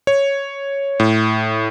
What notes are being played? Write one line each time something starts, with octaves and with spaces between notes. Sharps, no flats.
C#5
A2